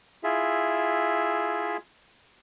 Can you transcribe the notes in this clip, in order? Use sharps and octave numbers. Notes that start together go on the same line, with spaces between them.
E4 F4 G#4 E5